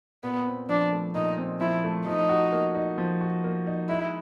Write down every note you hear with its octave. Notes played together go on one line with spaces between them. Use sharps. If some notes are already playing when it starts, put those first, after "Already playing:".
A#2 B3
C4
F3 D4
A3
A#2 D#4
C4
F3 E4
A3
F3 D#4
F#4
A#3
D#4
F3
F#4
A#3
D#4
G#3 E4